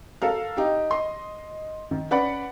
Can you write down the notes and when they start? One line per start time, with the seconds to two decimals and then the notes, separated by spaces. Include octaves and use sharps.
0.22 A4 A#4 F5
0.57 D#4 G4
0.91 D#5 C6
1.91 D#3
2.11 C#4 B4 D5 F#5 B5